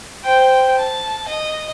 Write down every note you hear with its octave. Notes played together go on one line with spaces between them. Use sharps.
C5 G5
A5
D#5